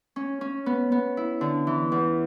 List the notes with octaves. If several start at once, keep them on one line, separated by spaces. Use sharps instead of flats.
C#4
C#4
B3
B3
E4
D3
E3
E2